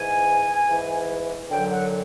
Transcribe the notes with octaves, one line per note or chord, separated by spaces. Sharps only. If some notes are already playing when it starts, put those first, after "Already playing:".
Already playing: G#2 E3 G#5
G#2 E3
F#2 D3 F#3 G5
F#5